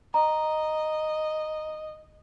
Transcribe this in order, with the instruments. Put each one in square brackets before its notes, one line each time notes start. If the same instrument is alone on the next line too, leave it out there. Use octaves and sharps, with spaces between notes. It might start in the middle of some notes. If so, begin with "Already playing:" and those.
[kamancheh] D#5 [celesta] A#5